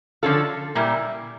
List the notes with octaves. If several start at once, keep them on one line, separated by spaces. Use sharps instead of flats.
D3 F3 C#4 F4 A4
A#2 G3 A#3 E4